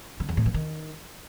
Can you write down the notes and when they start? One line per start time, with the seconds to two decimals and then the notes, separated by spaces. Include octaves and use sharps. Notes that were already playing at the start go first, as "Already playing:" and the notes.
0.20 D3
0.29 E2
0.37 A2
0.46 E3
0.54 D#3